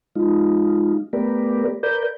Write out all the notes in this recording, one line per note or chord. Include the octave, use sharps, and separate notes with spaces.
G#3 D#4 F4
A3 B3 G4 A#4 B4 D5
A#4 B4 D5 G6